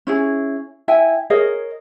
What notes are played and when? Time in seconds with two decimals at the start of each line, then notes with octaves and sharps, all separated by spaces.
0.07 C#4 E4 G#4
0.88 E4 E5 G5 G#5
1.30 G#4 A#4 C#5 D#5